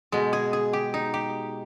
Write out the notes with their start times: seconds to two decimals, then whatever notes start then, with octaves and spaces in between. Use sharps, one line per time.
0.12 B2 G#3
0.33 G#4
0.53 G#4
0.73 G4
0.94 D#4
1.14 G4